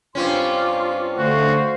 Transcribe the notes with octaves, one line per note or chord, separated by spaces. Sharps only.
G2 C4 C#4 F4 C6 D6
D3 A3 F#4 C5 F5